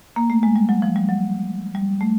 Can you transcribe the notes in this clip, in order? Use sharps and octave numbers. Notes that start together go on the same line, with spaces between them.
A#3
A3
G#3
G3
F#3
F3
G3
F#3
G3
A3